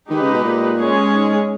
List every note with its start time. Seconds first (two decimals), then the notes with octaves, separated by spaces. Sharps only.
0.10 D#3 G#3 D#4 G4 B4
0.21 C#3
0.33 B2
0.44 A#2
0.79 G#3 C#4 G#4 C#5
1.14 G#2